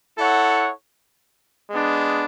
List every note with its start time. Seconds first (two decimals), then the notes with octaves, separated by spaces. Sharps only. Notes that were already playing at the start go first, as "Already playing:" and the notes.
0.17 E4 A4 C#5 F#5
1.70 G#3 B3 D4